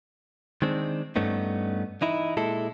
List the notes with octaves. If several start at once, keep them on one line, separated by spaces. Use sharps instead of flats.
D#3 G#3 C4 D4
G2 A3 B3 C#4 D#4
E3 D#4 E4
A#2 G#3 E4 A4